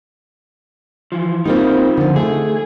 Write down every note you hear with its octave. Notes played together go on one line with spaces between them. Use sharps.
E3 F3
G3 A#3 C4 D#4 F4
D3 F3
A3 G#4